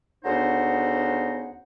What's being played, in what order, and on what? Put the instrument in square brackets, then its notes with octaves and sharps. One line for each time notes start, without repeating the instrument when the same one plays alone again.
[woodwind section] D2 C#3 B3 D#4 C5 F#5